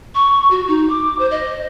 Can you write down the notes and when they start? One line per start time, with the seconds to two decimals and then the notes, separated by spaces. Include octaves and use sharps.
0.15 C#6
0.51 F#4
0.68 D#4
0.90 D6
1.19 C5
1.31 D#5